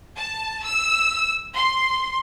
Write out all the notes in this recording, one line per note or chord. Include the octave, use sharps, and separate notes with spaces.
A5
E6
C6